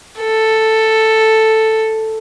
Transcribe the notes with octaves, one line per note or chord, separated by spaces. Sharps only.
A4